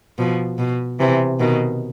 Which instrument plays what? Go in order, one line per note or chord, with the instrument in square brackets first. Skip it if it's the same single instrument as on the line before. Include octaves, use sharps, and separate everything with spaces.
[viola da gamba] B2 [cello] F3
[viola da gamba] B2
[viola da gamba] C3 [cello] E3
[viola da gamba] B2 [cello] D#3